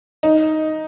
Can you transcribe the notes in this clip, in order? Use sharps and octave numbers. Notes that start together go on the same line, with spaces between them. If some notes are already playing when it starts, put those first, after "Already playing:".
D#4